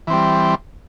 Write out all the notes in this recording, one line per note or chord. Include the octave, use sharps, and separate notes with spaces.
E3 G3 C4